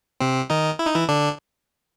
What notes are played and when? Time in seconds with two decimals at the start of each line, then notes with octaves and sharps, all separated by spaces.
0.20 C3 C4
0.50 D#3 D#4
0.79 E4
0.87 D#4
0.95 E3 E4
1.08 D3 D4